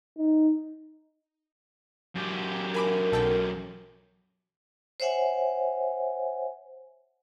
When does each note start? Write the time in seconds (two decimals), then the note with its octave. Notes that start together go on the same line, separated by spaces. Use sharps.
0.17 D#4
2.15 F#2 G4
2.74 A#4 G#5 B5 D6
3.12 B1 A4 G5
5.00 C5 C#5 E5 F#5 G#5